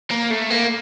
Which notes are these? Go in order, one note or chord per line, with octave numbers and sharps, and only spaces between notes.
A#3
A3
A#3